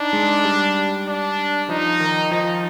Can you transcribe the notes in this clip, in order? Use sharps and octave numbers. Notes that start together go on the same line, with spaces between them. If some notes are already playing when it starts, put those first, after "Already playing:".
Already playing: D4 D#4
G#3
G3
D4
F3 D#4
D#3
F3 D#4